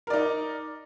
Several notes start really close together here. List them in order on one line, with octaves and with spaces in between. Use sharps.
A#4 D5 D#4